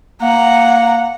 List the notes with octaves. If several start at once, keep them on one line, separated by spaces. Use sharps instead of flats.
A#3 F#5 A#5